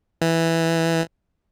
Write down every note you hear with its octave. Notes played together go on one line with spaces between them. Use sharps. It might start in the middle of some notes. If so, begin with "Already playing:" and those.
E3